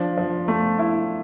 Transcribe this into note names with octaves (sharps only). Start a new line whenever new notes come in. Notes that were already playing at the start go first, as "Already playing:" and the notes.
Already playing: F3 D4
F3
A3
E4